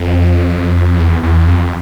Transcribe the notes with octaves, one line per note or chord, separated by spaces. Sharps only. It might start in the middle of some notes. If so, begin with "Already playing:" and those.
Already playing: F2
E2
E2
F2